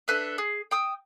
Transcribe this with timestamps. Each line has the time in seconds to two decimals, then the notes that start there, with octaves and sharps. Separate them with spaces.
0.08 D4 A4 B4 E5
0.38 G#4
0.71 G5 D#6 E6